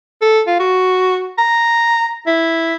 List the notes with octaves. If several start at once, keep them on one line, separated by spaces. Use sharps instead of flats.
A4
F4
F#4
A#5
E4